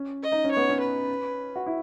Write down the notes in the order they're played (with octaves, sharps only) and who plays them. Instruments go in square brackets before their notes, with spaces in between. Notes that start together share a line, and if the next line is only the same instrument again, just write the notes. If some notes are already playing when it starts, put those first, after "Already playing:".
Already playing: [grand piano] C#4
[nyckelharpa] D#5
[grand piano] D#4
C#4
[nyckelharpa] C#5
[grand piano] B3
C#4
[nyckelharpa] B4
[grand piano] F#4
E4